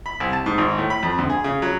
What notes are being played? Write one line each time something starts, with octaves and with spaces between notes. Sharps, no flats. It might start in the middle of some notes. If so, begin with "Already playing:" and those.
B5
C2
A5
G#2
G#1
A2
B5
F2
D2
G#4
C#3
F#3